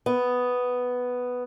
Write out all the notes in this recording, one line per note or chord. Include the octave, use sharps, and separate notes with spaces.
B3